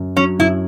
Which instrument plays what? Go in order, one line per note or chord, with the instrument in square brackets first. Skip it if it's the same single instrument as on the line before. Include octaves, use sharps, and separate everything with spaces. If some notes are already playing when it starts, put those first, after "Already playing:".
Already playing: [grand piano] F#2
[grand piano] F#3 [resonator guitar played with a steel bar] C#4
[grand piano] F#2 [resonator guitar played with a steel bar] E4